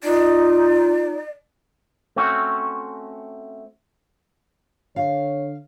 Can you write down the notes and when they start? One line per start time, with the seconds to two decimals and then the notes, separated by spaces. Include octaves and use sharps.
0.03 D#4 F4 D5
2.16 A3 C4 C#4 F#4
4.96 D3 C#5 F5